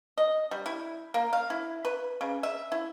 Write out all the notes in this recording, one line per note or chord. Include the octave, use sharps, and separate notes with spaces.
D#5
G3
E4
A#3
F5
E4
B4
C#3
E5
E4